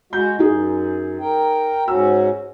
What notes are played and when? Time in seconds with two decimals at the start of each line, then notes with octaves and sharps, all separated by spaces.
0.13 G#3 F#4 G6
0.39 F#2 D#4 G#4
1.20 A#4 G5
1.88 G#2 C#4 F#4 E6